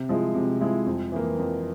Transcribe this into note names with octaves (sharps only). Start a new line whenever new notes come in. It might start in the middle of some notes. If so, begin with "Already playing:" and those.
Already playing: C3
F3 G#3 E4
C3
F3 G#3 E4
F2
E3 A#3
F2